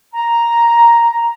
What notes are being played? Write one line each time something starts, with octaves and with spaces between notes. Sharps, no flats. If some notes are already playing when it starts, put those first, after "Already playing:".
A#5